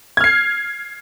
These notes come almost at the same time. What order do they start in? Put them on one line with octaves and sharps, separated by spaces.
G#6 F6 C7